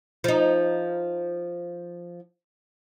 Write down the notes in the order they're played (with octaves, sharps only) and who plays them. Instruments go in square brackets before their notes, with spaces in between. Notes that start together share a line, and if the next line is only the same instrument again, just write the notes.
[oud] F3 D#4